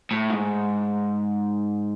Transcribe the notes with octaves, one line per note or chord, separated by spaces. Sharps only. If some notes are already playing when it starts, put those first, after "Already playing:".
A2
G#2